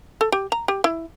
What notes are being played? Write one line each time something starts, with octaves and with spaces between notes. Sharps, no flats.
A4
G4
A#5
G4
E4